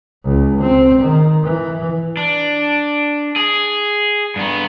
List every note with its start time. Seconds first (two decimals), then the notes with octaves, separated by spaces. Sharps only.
0.25 C#2
0.62 C4
1.02 D#3
1.44 E3
2.17 D4
3.36 G#4
4.36 G2 B3